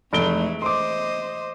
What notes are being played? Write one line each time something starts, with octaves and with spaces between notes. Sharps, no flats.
F1 E3 G#3 A3 D7 G7
C5 D#5 C6 D6